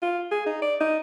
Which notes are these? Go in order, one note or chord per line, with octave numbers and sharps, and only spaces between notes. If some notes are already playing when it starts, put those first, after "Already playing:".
F4
G#4
D#4
D5
D#4